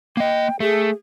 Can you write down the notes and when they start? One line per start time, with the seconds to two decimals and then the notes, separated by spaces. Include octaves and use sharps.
0.17 A#3 D#5 G5
0.60 A3 G#4